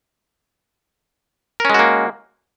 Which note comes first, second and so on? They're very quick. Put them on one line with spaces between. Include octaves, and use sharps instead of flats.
A#4 C#4 G#3 F#4 A#3